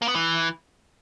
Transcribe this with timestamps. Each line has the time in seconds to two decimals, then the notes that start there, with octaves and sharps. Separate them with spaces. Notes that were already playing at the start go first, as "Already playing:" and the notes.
0.02 A#3
0.08 B3
0.15 E3